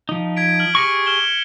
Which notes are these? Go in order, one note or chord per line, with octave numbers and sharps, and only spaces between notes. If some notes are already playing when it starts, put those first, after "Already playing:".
F3 D#4
G#6 B6 D7
F6 F#7
G4 G#4 C#6 A#6 C#7
F6 E7 G7